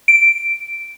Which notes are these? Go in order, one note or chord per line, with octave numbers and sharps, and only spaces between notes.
D7